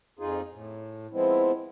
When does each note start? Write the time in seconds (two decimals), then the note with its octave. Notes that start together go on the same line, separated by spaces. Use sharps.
0.19 F2 D#4 F4 G#4
0.54 A2
1.13 F3 G#3 B3 C4 E4